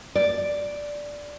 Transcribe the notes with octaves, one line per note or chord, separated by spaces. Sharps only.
D5